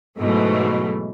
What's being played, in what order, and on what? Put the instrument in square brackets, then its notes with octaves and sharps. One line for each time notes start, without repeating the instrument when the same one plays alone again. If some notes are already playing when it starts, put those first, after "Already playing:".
[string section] G#2 B2 E3 F#3 A3